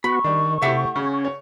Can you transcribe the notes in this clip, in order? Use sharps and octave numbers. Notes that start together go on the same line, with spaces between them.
B3 F#4 B5 C#6
D#3 G3 D4
C3 A3 E4 G4 E5 F#5
C#3 C#4
C#5